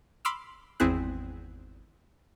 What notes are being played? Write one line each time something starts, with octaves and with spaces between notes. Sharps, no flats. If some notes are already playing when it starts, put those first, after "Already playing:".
B5 C6 D6 E6 F6
G#1 E2 C4 E4 G#4 F#6